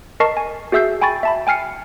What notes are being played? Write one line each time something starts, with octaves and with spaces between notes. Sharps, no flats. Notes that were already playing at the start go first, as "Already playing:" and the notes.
A#4 D#5 A5 C#6 C7
G#5
F#4 G#4 E5 E6 G6 C7
G5 G#5 B5 C#6 A6
E5 A5 B5
G5 G#5 F6 C7 C#7